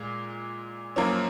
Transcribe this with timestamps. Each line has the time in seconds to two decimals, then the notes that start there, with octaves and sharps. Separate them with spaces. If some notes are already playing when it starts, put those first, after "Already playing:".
Already playing: A#2 G#3
0.96 F#2 F3 A#3 C#4